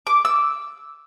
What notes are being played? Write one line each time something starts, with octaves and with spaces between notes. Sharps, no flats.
D6
E6